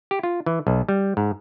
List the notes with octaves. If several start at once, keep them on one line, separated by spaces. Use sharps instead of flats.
G4
F4
E3
B1
G3
G#2